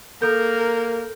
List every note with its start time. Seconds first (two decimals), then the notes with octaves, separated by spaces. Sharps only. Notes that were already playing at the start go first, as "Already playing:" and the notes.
0.22 A#3 A4 A#4 G6